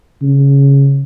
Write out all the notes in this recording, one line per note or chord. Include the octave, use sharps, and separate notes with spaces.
C#3